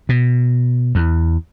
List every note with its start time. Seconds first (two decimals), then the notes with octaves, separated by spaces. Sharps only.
0.09 B2
0.95 E2